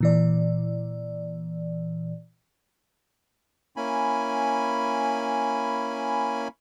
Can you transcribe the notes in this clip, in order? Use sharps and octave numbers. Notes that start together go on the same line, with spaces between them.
A#2 E3 D5
A#3 C#4 E4 G#5 B5